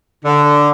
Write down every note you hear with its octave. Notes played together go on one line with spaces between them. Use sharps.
D3